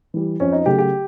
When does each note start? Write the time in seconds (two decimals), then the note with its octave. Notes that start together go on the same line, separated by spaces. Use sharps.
0.14 E3 G3
0.40 F2 C#4
0.52 D#4
0.66 C#3 F#3 A3 G4
0.78 G4